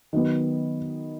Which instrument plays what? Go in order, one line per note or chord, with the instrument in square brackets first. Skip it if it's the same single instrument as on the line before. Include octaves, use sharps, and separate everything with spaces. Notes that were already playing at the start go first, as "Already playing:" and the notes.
[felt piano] D#3 F#3 B3